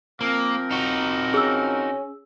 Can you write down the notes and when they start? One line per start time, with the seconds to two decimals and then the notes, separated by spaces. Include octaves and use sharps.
0.21 F3 A#3 C4 A#4
0.71 D#4 F#4
1.34 C#4 G#4 E6